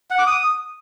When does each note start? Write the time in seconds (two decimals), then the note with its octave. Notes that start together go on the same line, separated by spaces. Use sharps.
0.11 F#5
0.19 D6
0.27 D#6